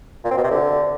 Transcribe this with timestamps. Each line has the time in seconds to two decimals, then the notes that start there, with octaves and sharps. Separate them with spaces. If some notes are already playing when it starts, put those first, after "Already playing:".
0.24 A#2
0.31 C4
0.37 B2
0.44 C3
0.50 D3